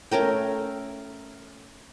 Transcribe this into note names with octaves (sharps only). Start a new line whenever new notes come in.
A3 C#4 A#4 G5